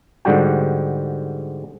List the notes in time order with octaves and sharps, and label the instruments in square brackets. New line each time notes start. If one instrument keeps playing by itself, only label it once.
[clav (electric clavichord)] G#2 D3 G3 F#4 G5